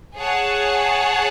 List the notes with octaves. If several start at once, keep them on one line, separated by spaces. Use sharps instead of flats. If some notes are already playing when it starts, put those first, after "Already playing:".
G#4 C#5 F#5 A5